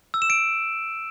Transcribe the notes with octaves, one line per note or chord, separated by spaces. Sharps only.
E6
E7
D7